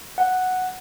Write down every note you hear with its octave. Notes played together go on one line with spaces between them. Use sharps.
F#5